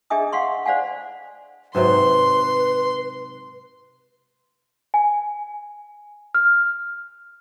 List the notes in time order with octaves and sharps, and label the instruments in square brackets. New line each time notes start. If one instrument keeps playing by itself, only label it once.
[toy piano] D4 G#4 D#5 E5 G#5 D#6
F5 F#5 C6 C#6
C5 D5 F5 F#5 G#5
[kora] G#2 C3 F#3 [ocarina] B4 [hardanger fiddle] C6
[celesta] G#5
F6